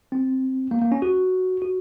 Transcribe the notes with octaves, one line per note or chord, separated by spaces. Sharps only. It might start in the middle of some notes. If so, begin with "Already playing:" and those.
C4
A#3
A#3
C#4
F#4
F#4